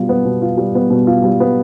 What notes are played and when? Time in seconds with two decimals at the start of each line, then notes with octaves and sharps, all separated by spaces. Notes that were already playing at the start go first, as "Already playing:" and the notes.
Already playing: B2 G3 F4
0.09 B3
0.25 B2
0.42 F4
0.58 G3
0.75 B3
0.90 B2
1.07 F4
1.24 G3
1.40 B3